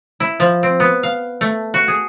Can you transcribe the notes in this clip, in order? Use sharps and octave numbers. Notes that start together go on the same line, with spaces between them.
E4
F3
C4
B3
F5
A3
F#4
G#4